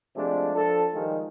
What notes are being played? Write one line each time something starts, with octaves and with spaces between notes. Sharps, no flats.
C3 F3 G#3 A3 D4
F3 D4 A4
D#3 F3 G3 G#3